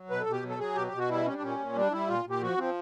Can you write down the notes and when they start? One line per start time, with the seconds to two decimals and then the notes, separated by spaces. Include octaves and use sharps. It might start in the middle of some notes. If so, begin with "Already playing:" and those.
Already playing: F#3
0.10 B2 B4
0.20 A4
0.26 B2
0.32 G4
0.43 F#3
0.50 A4
0.59 F#3 G#4
0.75 B2 G4
0.87 B2 G4
0.98 F#4
1.09 G3 E4
1.26 G3 C#4
1.34 D4
1.42 A#2 C#4
1.59 A#2
1.76 G3 D4
1.91 G3 E4
2.08 A#2 F4
2.25 A#2
2.30 G4
2.41 F3 F#4
2.58 F3 C4